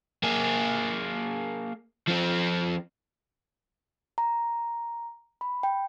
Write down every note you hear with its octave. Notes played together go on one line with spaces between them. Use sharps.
A#3 G#4
F3 C4
A#5
B5
G5